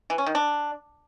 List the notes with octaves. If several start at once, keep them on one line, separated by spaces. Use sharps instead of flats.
E3
C#4
D#3
D4